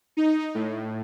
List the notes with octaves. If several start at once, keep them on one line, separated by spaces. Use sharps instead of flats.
D#4
A2